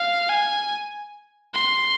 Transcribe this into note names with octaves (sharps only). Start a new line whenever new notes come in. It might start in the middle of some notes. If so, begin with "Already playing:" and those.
Already playing: F5
G#5
C6